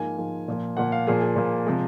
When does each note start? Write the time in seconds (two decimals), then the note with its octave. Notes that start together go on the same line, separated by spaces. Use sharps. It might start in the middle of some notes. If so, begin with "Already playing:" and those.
Already playing: G#2 F3 A#3 G#5
0.18 G#2 F3 A#3
0.48 A#2 F3 A#3
0.77 A#2 F3 A#3 F#5
0.92 F5
1.07 A#2 F3 A#3 G#4
1.22 G#4
1.36 A#2 F3 A#3
1.66 C3 F3 G#3